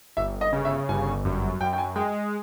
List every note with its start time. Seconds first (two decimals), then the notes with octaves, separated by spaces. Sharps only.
0.17 G1 E5
0.41 D#5
0.53 C#3
0.65 E5
0.89 G1 G#5
1.25 F#2
1.61 F#2 G5
1.73 G5
1.78 G#5
1.96 G#3 G5